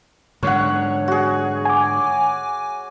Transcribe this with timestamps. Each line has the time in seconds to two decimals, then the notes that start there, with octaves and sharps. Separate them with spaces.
0.43 G#2 D3 C#5 F#5
1.08 F#4 G#4
1.65 G#5 D6